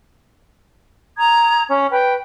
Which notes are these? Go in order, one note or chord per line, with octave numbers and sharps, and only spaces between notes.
A#5 D#6 G#6
C#4
B4 G5